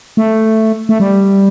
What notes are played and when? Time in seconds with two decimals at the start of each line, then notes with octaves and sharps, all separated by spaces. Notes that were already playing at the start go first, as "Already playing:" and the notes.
0.17 A3
0.89 A3
1.00 G3